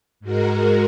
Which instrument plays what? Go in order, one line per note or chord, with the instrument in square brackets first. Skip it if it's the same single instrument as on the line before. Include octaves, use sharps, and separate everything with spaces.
[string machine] G#2 G#3 F#4 A#4